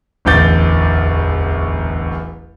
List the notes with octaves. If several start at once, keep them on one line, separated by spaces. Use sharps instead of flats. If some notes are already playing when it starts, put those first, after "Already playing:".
D1 A1 E2 D6 G6 A6